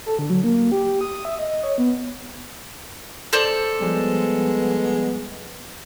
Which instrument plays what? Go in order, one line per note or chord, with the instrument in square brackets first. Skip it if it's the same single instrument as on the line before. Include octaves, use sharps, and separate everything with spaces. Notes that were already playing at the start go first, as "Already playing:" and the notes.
[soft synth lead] A4
D3
F#3
A#3
G4
D#6
E5
D#5
C#5
B3
[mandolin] A4 C5 D5
[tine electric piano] F3 G3 [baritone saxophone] G#3 [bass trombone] B3